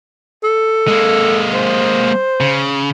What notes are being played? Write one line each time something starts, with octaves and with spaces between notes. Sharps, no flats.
A4
G#3 A#3
C5
C#3